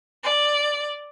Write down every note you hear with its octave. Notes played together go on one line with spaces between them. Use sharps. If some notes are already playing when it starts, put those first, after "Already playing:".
D5